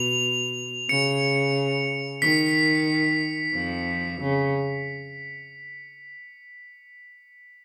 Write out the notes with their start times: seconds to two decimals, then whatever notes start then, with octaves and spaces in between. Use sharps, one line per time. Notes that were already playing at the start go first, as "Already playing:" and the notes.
Already playing: B2 F7
0.89 C#3 C#7
2.22 D#3 B6
3.54 F2 F3
4.20 C#3